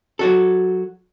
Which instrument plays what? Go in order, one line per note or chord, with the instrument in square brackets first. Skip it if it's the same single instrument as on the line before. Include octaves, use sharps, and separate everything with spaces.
[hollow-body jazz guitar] F#3 F#4 A4